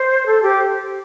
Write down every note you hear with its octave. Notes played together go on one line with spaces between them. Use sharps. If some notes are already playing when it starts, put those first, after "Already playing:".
Already playing: C5
A4
G4